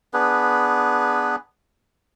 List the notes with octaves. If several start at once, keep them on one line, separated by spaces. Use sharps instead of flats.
B3 D4 G#4 B4